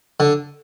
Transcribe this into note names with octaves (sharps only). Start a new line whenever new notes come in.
D3